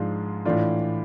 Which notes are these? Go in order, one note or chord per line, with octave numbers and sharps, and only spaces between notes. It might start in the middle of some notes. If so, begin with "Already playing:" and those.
Already playing: G#2 F3 G#3 D4 F4
A2 E3 A3 D4 F4